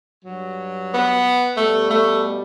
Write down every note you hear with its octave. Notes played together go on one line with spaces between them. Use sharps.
G2 F#3
B3
B2 G3 A3
A3